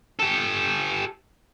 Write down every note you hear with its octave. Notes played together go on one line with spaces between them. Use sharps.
G4 A4